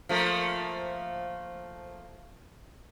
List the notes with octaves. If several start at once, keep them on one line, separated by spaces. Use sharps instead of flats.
F3 A3 A#3